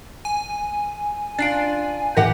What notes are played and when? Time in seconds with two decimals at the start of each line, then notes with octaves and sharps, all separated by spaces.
0.25 G#5
1.39 D4 F4 A6 C7 D7
2.17 A2 E3 G4 A#4 F#5